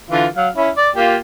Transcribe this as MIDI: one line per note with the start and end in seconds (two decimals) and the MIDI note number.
0.10 0.27 50
0.10 0.27 52
0.10 0.27 65
0.36 0.48 54
0.36 0.48 77
0.56 0.69 61
0.56 0.69 64
0.77 0.90 74
0.96 1.17 58
0.96 1.17 65
0.96 1.17 67